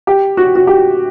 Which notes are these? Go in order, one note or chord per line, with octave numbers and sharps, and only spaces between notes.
G4
F#4
F#4
G4